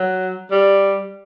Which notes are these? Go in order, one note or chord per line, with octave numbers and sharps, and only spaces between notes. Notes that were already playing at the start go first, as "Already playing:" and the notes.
Already playing: F#3
G3